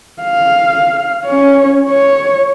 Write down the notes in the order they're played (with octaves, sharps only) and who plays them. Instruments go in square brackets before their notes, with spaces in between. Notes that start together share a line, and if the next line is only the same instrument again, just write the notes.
[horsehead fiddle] F5
C#4 C#5
C#5